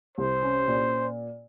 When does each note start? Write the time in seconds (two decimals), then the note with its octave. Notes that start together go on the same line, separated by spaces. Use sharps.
0.17 C2 C5
0.42 C#4
0.68 A#2